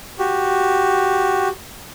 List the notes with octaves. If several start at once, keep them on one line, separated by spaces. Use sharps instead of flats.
F#4 G4